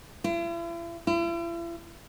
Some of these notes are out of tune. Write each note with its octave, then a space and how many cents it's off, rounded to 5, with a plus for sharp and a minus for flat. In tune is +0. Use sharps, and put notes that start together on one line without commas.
E4 +45
E4 +45